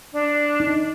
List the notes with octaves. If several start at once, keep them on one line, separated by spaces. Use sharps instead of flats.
D4
D#4